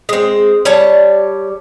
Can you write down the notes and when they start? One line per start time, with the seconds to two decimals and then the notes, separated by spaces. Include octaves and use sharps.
0.09 G#3 C4
0.65 G3 C#5 A5